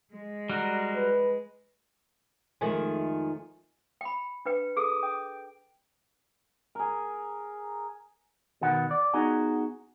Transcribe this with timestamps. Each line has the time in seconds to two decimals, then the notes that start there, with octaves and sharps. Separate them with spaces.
0.14 G#3
0.50 G3 F#4 A#4
0.96 B4
2.61 F2 D#3 F3 G#3 A3 G#5
4.01 G5 B5
4.46 D4 B4 G5
4.77 G#4 A4 D6 D#6
5.03 G5
6.75 G#4 A#4
8.61 B2 D#3 B3 F#5
8.91 D5
9.13 B3 D#4 F#4 G#4